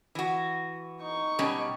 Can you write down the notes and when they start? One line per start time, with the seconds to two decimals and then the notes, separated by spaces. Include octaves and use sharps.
0.15 E3 F#4
1.01 D#4 C#6
1.39 B2 G3 C#4